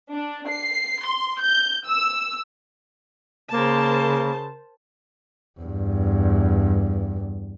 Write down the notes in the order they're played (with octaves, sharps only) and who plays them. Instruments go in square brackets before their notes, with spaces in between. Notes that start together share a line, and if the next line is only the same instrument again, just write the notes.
[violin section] D4
C7
C6
G6
E6
[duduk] C#3 [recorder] A#3 [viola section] A#4 C5 A5
[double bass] E2 G2